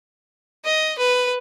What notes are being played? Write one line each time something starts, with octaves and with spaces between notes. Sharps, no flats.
D#5
B4